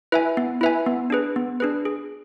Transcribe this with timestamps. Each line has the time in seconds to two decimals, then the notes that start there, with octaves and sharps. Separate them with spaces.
0.12 E4 B4 E5 G#5
0.37 B3
0.61 E4 B4 E5 G#5
0.86 B3
1.10 D4 G#4 B4
1.36 B3
1.60 D4 G#4 B4
1.85 G#4